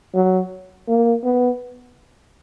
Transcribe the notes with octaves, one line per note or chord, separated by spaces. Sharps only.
F#3
A#3
B3